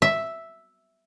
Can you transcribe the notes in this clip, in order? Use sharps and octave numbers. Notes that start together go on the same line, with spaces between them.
E5